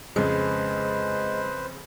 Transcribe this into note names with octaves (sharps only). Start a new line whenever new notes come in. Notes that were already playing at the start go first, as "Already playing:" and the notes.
F2 C#3 G#3 B4 C5